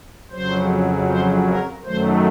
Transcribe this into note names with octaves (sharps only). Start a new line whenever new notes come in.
F2 C#3 F#3 C5
C5
A#4
F#2 D#3 F#3 A3 C5